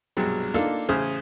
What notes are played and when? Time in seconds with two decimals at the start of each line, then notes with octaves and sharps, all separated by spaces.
0.17 C2 G2 B2 F#3 G#3
0.54 A#3 D4 D#4 F4 A4 F5
0.89 A1 C#3 C5 G#5 D#6 F6